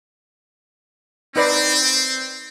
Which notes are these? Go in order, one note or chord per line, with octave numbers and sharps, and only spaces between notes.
C4 D#4 B4 D5